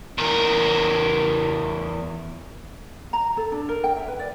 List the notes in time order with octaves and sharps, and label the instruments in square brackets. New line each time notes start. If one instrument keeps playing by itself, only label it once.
[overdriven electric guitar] E2 A#4
[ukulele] A#5
A4
D4
A#4
G5
E5
B4
D5